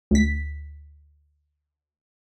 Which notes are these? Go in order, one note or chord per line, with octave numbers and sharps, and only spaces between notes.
D2 B6